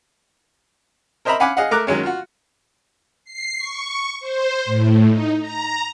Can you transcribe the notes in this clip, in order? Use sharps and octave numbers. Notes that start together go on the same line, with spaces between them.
A#4 C5 D#5 E5 A#5 B5
F5 F#5 G#5 B5 D6
G#4 D#5 F5 F#5
A3 A#4 A#5 D6 F#6
D#3 F#3 G#3 C#4
F4 F#4
C7
C#6
C5
A2
D#4
A#5